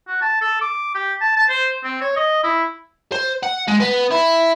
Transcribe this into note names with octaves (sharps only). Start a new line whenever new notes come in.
F#4
A5
A4
D6
G4
A5
A5
C5
C4
C#5
D#5
E4
C5
F#5
G#3
B3
E4